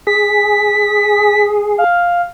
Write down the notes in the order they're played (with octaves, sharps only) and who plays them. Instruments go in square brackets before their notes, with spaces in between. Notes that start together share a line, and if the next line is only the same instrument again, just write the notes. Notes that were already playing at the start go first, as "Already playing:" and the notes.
[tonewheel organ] G#4 [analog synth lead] B6
[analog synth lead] F5